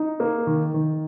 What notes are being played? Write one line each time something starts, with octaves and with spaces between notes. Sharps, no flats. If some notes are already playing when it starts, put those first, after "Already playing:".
Already playing: D#4
A#3
D#3
D#3